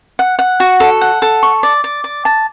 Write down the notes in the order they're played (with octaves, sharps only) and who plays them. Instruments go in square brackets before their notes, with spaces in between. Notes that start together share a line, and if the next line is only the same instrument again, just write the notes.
[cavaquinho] F#5
F#5
F#4
A4
F#5
A4
C#6
D5
D5
D5
A5